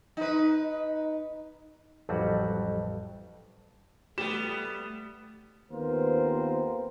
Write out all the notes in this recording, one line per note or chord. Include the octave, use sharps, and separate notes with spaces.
D#4 B4
A1 F2 F#3 G3 F#4 F#5
G3 A3 B3 G4 E7
D#2 B3 C4 F4 A#4 C5